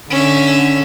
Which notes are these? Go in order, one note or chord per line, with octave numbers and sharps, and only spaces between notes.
D3 C#4 E5